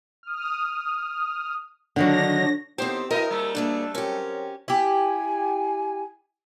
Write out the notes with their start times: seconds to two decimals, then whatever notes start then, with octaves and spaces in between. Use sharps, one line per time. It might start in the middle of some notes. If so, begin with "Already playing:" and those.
0.23 D#6 F6
1.96 D3 D#3 F#3 D4 C#5 A#6
2.78 A2 D#3 B3 C4 G4 C5
3.11 B2 E4 A#4 D#5 G5
3.30 A#2 G3 A3 D#4
3.55 D2 A#3 D4 G#4
3.95 F#3 C4 C#4 G4 A#4
4.68 E4 G4 G#5